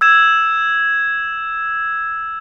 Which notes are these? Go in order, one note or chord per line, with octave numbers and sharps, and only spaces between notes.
E6 G#6 E7